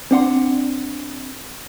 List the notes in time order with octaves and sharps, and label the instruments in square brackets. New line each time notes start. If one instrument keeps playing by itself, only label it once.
[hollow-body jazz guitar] C4 D4 F#5 C6